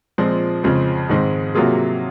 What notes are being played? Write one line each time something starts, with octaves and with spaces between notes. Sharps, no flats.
A#2 F3 G#3 C4
F2 C#3 F3 G#3 C4
G#2 D#3 G#3 C4
C3 F#3 A#3 F4 G#4